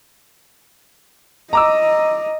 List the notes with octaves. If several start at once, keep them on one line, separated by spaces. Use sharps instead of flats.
D#5 A#5 D6 E6